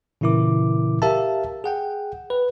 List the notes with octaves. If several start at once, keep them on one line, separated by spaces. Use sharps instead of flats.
A#2 C#3 E3 E4 A#4 D6
G4 A#4 E5 F5 A5
G#4 F#5 G5
B4